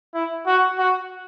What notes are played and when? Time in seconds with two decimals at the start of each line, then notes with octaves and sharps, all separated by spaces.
0.14 E4
0.47 F#4
0.79 F#4